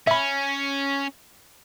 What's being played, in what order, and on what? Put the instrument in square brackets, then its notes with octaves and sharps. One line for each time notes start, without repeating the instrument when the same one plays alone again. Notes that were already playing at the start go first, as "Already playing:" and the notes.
[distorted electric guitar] C#4 [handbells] E5 B5